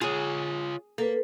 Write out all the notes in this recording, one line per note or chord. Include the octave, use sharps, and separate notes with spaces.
F4 G#4 C#5
A#3 A4 B4